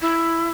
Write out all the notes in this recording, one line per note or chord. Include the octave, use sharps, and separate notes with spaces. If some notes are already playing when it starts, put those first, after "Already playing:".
E4